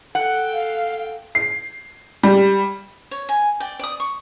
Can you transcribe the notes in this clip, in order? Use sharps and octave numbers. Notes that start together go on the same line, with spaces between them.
A4 F#5 G5
F5
C7
G3
C#5
G#5
D5 G5
D5 D#6
C#6